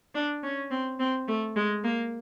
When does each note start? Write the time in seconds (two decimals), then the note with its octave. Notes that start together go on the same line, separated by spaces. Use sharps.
0.15 D4
0.43 C#4
0.71 C4
1.00 C4
1.28 A3
1.56 G#3
1.84 A#3